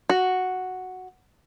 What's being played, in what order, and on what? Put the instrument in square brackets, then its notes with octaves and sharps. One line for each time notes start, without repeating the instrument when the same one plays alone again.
[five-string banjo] F#4